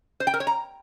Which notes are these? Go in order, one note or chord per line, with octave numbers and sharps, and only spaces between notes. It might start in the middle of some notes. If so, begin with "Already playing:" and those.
C5
G5
A#4
C#5
A#5